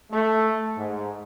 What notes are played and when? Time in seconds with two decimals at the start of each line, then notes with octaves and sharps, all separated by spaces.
0.11 A3
0.77 G#2